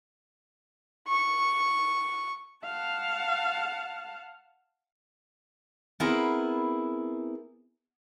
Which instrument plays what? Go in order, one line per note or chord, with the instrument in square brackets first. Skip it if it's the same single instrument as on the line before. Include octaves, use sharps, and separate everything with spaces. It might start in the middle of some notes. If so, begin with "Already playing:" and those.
[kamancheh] C#6
[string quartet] F5 F#5 A5
[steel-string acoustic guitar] B3 C4 E4 G#4 A#4 B4